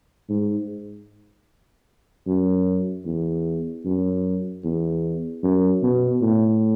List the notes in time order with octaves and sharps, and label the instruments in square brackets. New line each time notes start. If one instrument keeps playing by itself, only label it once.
[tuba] G#2
F#2
E2
F#2
E2
F#2
B2
A2